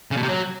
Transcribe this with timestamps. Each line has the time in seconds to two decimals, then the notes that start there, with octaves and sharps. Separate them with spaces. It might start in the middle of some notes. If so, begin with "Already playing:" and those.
0.11 C#3
0.17 B2
0.23 C3
0.28 F#3